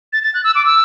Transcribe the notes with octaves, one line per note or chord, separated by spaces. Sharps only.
A6
A6
F#6
E6
D6
E6